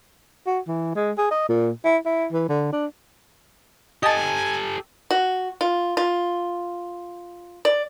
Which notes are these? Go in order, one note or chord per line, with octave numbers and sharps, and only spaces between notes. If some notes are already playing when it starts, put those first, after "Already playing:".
F#4
E3
G#3
G#4
D#5
A#2
E4
E4
E3
D3
D4
G4 A4 D#5 G#5 A5
F#4
F4
F4
D5